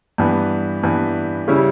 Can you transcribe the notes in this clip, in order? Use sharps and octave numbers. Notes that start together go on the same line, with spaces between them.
G2 E3 B3
G2 E3 B3
C#3 G3 C#4 E4